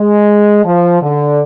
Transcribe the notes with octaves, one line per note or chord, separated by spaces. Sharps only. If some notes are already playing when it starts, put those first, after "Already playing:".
Already playing: G#3
F3
D3